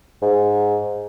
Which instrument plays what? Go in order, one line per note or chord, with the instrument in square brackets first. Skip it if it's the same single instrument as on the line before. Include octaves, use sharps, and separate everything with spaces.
[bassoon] G#2